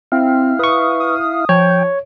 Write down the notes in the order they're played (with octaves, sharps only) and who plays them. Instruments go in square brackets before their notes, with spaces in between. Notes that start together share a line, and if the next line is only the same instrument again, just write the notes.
[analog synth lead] C4 [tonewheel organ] E4 F5
[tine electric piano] B4 C#6 [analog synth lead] D#6
[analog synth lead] D#6
[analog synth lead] F3 [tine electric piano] C#5 [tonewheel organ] G5